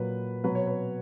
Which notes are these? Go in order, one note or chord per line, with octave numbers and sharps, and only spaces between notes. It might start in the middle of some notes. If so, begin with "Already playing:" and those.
Already playing: A#2 F#3 B4
B2 F#3 B4
C#5
B4